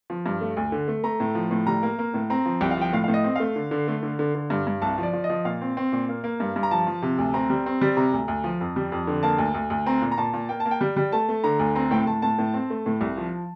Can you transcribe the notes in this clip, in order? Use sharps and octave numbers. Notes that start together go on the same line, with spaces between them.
F3
G2
A3
D2
D3
A3
A3 A#5
A2
F3
A2
G3 A#5
A#3
A#3
A2
C4 A#5
F3
C2 G5
F5
F3 G5
A2 F5
A2 F5
D#5
C4
A3 F5
D3
D3
A3
D3
D3
D3
G2
G2
C2 A5
F3 D5
F3
D#5
F3
A#2 F5
C4
C4
A#2
A#3
A#3
G2
G2
A#5
F3 A5
F3
C3
D2
C4 A#5
G3
C4
G3
C3 A#5
D2
D2
F3
F2
G3
F2
D3
A#3 A5
D2
D2
D2
C4 A#5
A#2
A#5
A#2 A5
A#2
A#3 G5
A5
A#3
G5
G3
G3
A3 A5
A3
D3 A#5
D2
C4 A#5
A2 G5
A2 A5
A2 A5
A2
C4
A3
A2
C2
F3